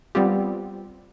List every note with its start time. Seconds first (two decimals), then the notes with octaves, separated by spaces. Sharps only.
0.15 G3 B3 C4 F4 G4